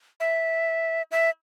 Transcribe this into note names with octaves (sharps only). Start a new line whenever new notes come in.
E5
E5